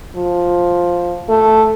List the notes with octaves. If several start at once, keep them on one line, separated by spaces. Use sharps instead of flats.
F3
A3